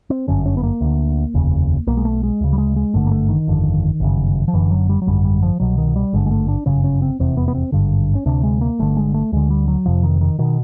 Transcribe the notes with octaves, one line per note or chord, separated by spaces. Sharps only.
C4
G1 F#2 D3 C#4
C#4
B3
A#3
D2 D3
F1 D#2 C#3
B1 B2 A#3
G#3
A3
G#3
D2 C#3
G3
G#3
G#3
G#1 G2 D3 A3
A#3
A3
D#3
G1 F2 D3
G1 F#2 C#3
F3
F#1 F#2 D3 E3
F#3
G3
F#3
G#1 F#2 D3 G3
G3
F3
C2 B2 F#3
D#3
G3
G#1 G2 D3 G#3
G#3
A3
D4
G1 F#2 C#3 C#4
C#4
C4
F1 E2 C3 C4
B3
B3
C4
G#1 G2 D3
C#4
D2 C3 D4
G#3
A#3
G1 G2 D3 A3
G#3
A3
D2 D3 G#3
G3
F#3
F1 F2 C3 F3
D#3
D#3
B2 D#3